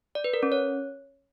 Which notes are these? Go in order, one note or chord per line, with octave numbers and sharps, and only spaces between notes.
D5
B4
A#4
C#4
C#5